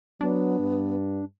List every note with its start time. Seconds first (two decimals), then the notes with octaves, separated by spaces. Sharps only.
0.21 F#3 B3 D4
0.59 G2